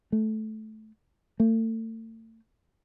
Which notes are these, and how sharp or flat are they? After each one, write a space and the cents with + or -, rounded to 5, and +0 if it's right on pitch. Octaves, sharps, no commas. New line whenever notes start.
A3 -15
A3 +35